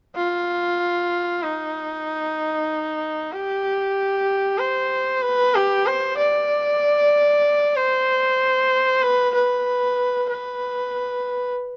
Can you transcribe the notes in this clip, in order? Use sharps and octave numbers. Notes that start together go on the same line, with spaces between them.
F4
D#4
G4
C5
B4
G4
C5
D5
C5
B4
B4
B4